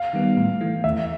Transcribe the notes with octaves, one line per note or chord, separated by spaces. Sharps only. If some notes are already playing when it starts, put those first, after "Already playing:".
Already playing: F5
D#3 G3 B3
A2
E3 A3
D#2 E5